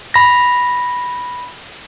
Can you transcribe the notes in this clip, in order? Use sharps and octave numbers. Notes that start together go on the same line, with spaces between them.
B5 A#6